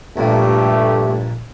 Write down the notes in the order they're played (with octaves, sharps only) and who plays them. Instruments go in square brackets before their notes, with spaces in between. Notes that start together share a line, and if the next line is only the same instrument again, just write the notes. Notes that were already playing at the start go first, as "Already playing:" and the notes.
[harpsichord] A#1 A#2 [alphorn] G2 [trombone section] A3 G4